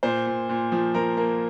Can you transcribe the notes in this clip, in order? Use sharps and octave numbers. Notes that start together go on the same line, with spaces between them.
A#2 C5
A#2
A#2
F3
F3 A#4
A#3